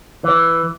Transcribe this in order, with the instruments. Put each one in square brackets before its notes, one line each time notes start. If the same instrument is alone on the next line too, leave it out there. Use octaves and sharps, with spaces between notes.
[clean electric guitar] E3